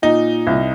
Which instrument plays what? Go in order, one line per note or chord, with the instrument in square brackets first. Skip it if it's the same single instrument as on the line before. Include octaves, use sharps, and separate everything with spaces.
[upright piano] A#2 [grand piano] D#4
[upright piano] C2